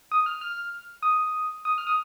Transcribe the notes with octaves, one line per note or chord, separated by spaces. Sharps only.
D#6
F6
F6
D#6
D#6
F6
D#6